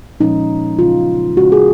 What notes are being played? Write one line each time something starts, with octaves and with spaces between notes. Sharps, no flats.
A#2 F3 G#3 C#4 D#4
C#3 F#3 C#4 F4
C#3 G#3 C#4 F#4
G#4